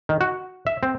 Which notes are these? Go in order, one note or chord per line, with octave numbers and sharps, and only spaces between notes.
D#3
F#4
E5
C4